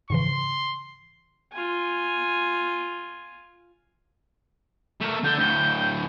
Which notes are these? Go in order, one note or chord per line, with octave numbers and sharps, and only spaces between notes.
G#2 C#3 E3 C6
F4 G#5
A3 A#4
D3 G6
D2 A2 G6